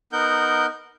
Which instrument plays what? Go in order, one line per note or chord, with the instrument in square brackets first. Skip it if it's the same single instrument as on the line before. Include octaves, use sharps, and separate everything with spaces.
[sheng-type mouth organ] B3 D#4 A#4 F#5 G6